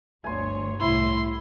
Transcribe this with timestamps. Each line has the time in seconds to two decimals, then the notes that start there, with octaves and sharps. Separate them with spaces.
0.24 G1 D2 C#5 G#5 C6
0.80 C2 A2 E4 C6